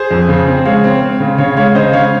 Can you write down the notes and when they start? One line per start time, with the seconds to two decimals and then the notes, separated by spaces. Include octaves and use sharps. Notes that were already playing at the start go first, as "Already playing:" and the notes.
Already playing: G#4 C5
0.11 F2
0.29 C#3
0.47 C4
0.65 G#3 C#5 F5
0.84 C4
1.02 C4
1.20 C#3
1.38 C#3 C#5 F5
1.57 G#3 C#5 F5
1.75 C#3 C5 D#5
1.93 C#3 C#5 F5